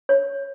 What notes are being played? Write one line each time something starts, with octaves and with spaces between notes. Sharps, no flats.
C#5